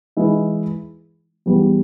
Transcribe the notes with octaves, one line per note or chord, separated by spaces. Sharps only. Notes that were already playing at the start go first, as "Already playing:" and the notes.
E3 G#3 E4
E2 E3 G3